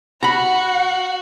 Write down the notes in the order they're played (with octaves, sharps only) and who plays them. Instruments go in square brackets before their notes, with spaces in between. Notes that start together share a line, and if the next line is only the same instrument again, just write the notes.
[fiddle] F#4 [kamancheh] F#5 [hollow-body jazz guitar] A#5 B5